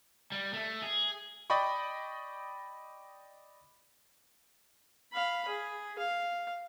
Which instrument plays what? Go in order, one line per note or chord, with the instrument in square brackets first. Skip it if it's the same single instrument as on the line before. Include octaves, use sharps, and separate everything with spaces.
[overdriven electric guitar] G3
A3
G#4
[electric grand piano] D5 D#5 G5 B5 C#6
[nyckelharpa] F5 B5
G#4
F5